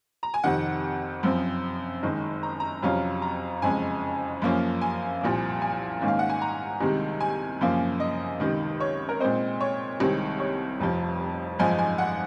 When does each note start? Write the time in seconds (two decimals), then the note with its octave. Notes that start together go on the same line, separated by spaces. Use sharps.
0.23 A#5
0.34 G#5
0.44 F2 C3 D#3 F#5
1.23 F#2 F3 C4
2.03 F#1 F#2 D#3 G#3
2.43 A#5
2.60 A#5
2.83 F2 C3 F#3 C#4 F4
3.22 A#5
3.62 F#1 F2 C#3 G#3 G#5
4.42 F#2 F3 A#3 C#4 F4
4.82 G#5
5.21 C2 A#2 F3 A#3
5.62 G#5
6.01 G#2 D#3 A#3 C#4
6.08 F5
6.19 F#5
6.30 G#5
6.42 A#5
6.80 C2 C3 D#3 G#3
7.21 G#5
7.61 F#2 C#3 F3 A#3
8.00 D#5
8.40 C#2 C3 D#3
8.80 C#5
9.09 A#4
9.20 A#2 G#3 C4 D#4 C5
9.60 C#5
10.00 C2 C3 D#3 G#3 C4
10.40 C#5
10.80 F1 F2 C3 F3
11.59 G#1 F#2 F3 G#3 D#4 G#5
11.79 G#5
11.98 F#5